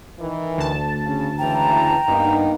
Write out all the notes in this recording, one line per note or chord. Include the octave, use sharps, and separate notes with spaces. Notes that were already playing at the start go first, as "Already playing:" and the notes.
D#3 E3
D2 A5
C#3
G#2 C#3 E3 G5 A#5
G2 A#3 B3 D#4